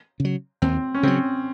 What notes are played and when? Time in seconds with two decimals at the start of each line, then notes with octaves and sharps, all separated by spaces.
0.20 C#3 F#3
0.62 D#2 C4
0.94 C#4
1.03 C#3 F#3 C4